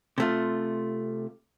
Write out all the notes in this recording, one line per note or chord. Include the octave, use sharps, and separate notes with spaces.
C3 A3 F4